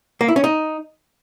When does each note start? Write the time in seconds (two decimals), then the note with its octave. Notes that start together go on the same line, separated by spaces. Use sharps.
0.21 A#3
0.28 E4
0.36 C#4
0.44 D#4